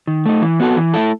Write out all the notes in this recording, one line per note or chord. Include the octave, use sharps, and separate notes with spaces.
D#3
A3 D#4
E3
B3 F#4 A4
E3
A3 E4 A4